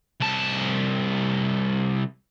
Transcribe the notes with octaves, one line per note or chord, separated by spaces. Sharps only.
C2 A5